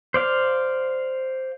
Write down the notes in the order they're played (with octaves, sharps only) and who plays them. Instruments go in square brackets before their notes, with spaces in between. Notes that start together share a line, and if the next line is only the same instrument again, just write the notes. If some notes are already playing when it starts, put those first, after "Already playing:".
[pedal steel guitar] C5 D5 F5